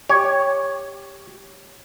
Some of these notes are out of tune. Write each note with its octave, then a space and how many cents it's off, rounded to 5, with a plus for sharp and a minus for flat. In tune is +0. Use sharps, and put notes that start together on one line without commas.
G4 +10 C#5 +0